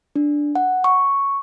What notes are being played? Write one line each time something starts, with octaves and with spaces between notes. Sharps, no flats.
D4
F#5
C#6